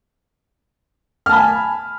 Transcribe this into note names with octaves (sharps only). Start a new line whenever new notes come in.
G#5 A5 B5 F6